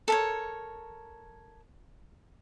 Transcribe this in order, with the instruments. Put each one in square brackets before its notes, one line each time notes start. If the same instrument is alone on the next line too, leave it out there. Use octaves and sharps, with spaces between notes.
[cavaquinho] A4 A#4 C#5